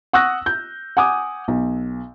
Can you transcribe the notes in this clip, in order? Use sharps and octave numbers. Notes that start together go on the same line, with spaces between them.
F#5 C#6 D#6 E6 F#6 A#6
G6
F#5 G#5 D6 D#6
B1